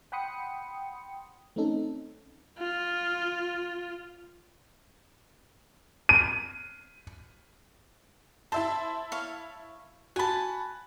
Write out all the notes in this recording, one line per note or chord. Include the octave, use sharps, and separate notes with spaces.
F#5 G5 B5 C6 D#6 C#7
A3 C4 C#4 D#4 A4
F4
D#7
E4 C5 E5 A5
C#5 F5
F#4 G#5 A5 B5